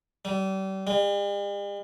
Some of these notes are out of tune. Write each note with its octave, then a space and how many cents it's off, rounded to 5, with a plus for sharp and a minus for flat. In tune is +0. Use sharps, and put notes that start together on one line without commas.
G3 -35
G3 +45